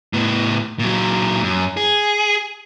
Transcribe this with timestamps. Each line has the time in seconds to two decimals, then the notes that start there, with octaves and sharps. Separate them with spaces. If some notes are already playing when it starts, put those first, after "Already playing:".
0.13 A2 B3
0.79 A#2 F#3
1.43 F#2
1.77 G#4